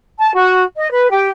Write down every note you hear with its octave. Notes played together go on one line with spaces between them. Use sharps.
A5
F#4
D#5
B4
G4